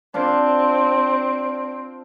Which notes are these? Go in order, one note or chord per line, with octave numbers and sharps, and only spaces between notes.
C4 D4 F4 C5